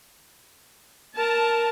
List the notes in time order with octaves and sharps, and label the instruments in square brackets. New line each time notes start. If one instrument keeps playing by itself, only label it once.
[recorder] A#4 [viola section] A5